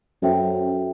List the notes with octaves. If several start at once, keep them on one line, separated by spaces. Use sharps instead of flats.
F#2 F#4 A4 C5 E5 G5